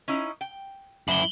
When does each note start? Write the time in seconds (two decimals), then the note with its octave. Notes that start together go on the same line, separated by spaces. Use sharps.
0.08 C#4 D#4 E4
0.41 G5
1.08 F#2 E4 F#7 G7